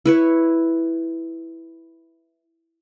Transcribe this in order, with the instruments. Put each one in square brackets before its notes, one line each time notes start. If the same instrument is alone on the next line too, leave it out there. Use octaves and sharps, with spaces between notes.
[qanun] E4 B4 C#5